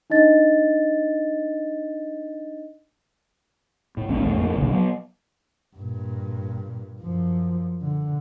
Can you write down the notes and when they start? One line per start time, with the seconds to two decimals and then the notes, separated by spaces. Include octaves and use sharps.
0.10 D4 D#4 D#5 A6
3.97 A2
4.09 A1 D#2 G#2 C#4
4.20 B1 E2 A3 C#4
4.34 F2 A2 A#3
4.56 F#1 B1 D3
4.73 F#3 B3
5.76 G2 A#2
7.02 F#2 F3
7.82 D3